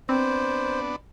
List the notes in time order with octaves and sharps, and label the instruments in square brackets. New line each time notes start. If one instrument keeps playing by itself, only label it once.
[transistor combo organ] B3 D4 [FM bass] C4 [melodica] C5